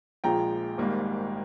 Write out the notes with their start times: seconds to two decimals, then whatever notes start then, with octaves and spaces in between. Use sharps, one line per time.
0.24 A#1 A#2 F3 G#3 G5 A#5
0.78 G#1 G#2 G3 A#3